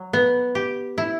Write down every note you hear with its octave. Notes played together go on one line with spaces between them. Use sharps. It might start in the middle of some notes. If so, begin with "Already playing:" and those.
Already playing: F#3
B3
G4
E4